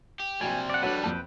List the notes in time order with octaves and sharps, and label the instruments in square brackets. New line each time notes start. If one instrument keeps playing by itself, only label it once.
[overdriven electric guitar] G4
[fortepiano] A#1 F#3 G5 [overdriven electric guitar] C3 G3 [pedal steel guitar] G#5
[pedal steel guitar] D5 F#5
[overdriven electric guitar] F#3 G3 [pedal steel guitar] D4 A4 B4 [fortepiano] F#4 C#5 F#5
[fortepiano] F2 A5 [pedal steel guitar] B4 G5